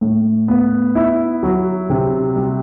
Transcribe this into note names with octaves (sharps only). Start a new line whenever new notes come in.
A2
B3
E4
F#3
C3
G3